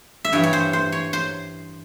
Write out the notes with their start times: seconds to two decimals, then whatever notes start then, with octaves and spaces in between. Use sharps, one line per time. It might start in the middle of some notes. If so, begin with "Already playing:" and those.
0.25 E5
0.32 G2 E3 G3 C#5
0.43 C#5
0.53 C5
0.73 C5
0.92 C#5
1.13 C5